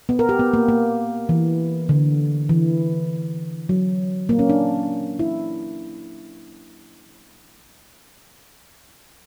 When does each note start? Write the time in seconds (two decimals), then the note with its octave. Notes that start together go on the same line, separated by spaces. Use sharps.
0.09 B3
0.19 A#4
0.29 G4
0.39 B3
0.54 A#3
0.69 A#3
1.29 E3
1.89 D3
2.49 E3
3.69 F#3
4.29 A#3
4.39 C#4
4.49 D4
5.19 E4